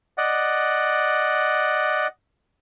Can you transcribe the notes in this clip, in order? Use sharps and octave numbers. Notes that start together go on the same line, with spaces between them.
D5 D#5 F#5